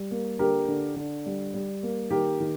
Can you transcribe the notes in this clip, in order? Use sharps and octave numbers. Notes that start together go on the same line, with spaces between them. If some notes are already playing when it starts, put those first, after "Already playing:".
Already playing: G3
A#3
D3 G4 A#4
D3
D3
G3
G3
A#3
D#3 G4 A#4
D#3